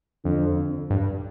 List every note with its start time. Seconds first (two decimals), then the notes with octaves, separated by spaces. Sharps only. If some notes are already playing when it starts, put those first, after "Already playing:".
0.24 F2 D3
0.90 G2